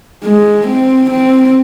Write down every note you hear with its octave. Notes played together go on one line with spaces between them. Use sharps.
G#3
C4
C4